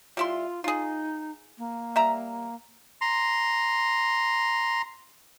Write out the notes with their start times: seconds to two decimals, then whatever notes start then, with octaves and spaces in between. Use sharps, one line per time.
0.17 G3 E4 F4 C6
0.64 D#4 F4 G#4
1.58 A#3
1.96 G3 E5 A#5
3.01 A#5 C6